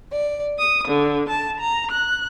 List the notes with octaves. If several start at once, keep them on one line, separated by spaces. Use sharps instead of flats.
D5
D#6
D3
A5
A#5
F#6